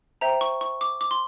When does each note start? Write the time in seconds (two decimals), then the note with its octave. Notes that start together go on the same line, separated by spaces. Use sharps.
0.21 C5 E5 G5 A#5
0.41 C#6
0.61 C#6
0.81 D6
1.01 D6
1.11 C6